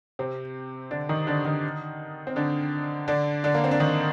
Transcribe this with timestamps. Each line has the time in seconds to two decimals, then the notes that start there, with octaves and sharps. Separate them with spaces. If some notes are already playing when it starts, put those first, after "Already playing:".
0.19 C3 C4
0.91 D3 D4
1.09 D#3 D#4
1.27 D3 D4
1.45 D#3 D#4
2.27 C4
2.36 D3 D4
3.08 D3 D4
3.44 D3 D4
3.54 A#3
3.64 C4
3.71 D4
3.80 D#3 D#4